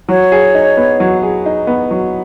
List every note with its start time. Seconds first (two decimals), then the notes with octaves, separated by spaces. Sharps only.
0.09 F#3 C#5
0.32 G#4
0.55 D#4
0.77 B3
1.00 F#3
1.22 G#4
1.46 D#4
1.67 B3
1.91 F#3